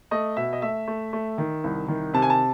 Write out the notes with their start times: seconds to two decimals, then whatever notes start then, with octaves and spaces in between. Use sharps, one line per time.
0.11 A3 D#5
0.37 B2 E5
0.53 D#5
0.62 A3 E5
0.88 A3
1.13 A3
1.38 D#3
1.64 C2
1.88 D#3
2.14 C3 A5
2.22 G#5
2.30 A5